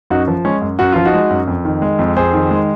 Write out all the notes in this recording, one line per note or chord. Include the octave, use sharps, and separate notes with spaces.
F#2 D#4 F#4
F3
G#3 C#4
F#2
F#2 F#4
F3 F4
D#4 F#4
G#3
F#2
F2
D#3
G#3
F2
F2 G#4 C5
D#3
G#3